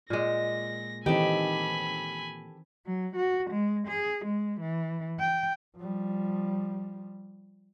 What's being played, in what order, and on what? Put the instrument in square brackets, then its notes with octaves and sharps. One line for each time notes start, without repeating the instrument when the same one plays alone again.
[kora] A#2 G#3 [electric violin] A#6
[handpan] D#3 E3 C4 [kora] D#4 [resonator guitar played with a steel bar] G4 A4 [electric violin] G#5 B5
[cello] F#3
F#4
G#3
G#4
G#3
E3
G5
[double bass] F3 G3